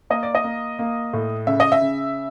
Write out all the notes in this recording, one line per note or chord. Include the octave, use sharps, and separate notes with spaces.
A#3 D#5
D5
D#5
A#3
A#3
A2
C#3 E5
D#5
E5
C#3